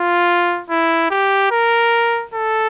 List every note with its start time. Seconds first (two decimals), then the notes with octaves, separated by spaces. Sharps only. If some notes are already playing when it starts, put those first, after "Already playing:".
Already playing: F4
0.70 E4
1.10 G4
1.51 A#4
2.34 A4